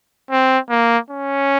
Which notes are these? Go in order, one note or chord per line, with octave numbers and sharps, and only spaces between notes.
C4
A#3
C#4